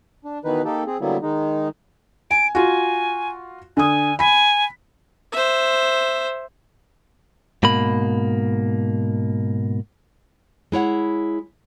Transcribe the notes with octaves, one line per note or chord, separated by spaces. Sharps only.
D4
B2 D#3 E3 D#4 B4
A#3 D#4 G4 A4
C4 G#4
D3 F#3 G3 A#3 B3 E4
D#3 G#3 D#4
G#5 D7
F4 F#4 G#5
D3 G#5 D#6
G#5 B5 B6
C5 E5
G#2 B2 A#3 B5
G#3 E4 C#5 F#5